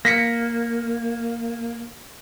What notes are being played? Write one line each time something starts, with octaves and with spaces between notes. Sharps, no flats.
A#3 A#6 B6 C#7